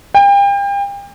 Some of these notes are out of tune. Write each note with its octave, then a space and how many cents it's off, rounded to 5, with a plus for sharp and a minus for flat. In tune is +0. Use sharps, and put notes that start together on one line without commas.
G5 +35